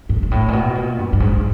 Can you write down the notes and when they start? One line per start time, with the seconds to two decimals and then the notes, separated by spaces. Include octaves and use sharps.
0.09 G#2
0.23 G#2
0.31 A2
0.48 A#2
0.53 B2
0.75 A#2
0.98 G2
1.13 G2
1.20 G#2